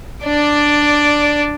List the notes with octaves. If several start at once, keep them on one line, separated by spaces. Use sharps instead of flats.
D4 D5